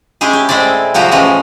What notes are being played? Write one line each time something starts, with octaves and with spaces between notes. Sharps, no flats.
G#3 C#4 E4 G4 G#4
G4
A2 G#3 C4 E4 D5
C3 F3 C4 F#4 G4
A2 E3 F3 G#3 C#4